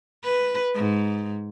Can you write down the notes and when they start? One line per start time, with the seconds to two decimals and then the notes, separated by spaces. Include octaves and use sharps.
0.24 B4
0.74 G#2